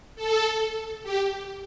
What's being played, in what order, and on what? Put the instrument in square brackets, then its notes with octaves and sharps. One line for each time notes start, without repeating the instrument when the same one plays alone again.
[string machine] A4
G4